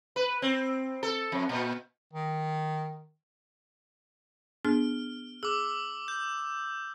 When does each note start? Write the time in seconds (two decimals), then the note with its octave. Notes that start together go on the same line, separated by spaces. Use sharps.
0.16 B4
0.42 C4
1.03 A4
1.32 F2
1.49 A#2
2.13 D#3
4.65 B3 D4 G#4 F6
5.43 G#4 D6 E6
6.08 G6